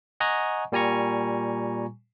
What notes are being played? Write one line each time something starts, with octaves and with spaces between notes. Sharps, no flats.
D#5 F#5 G#5 A#5 C#6
A#2 G3 G#5 A#5 C#6